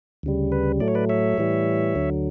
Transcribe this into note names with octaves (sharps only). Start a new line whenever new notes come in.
D2 C#3 G3
B4
A2 F#3 A3 D5
C#5
B4 D5
C#5 E5
A2 E3 G3
D2 D3 F#3